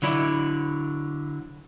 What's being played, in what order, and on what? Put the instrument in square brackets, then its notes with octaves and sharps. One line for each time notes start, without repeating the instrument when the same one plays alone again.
[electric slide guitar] D3 F#3 E4 D5